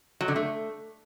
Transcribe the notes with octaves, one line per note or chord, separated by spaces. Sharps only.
F#3
D3
A3